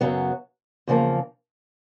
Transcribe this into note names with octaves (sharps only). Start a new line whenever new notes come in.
F#2 C#3 F#3 B3
E2 C#3 F3 A#3